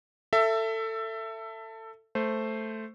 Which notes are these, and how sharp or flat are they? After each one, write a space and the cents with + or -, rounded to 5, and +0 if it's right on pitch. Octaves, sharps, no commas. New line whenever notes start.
A4 +20 E5 +15
A3 +0 C5 +0